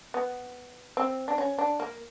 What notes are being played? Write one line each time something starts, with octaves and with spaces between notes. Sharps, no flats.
B3
C4
D4
C#4
D4
A#3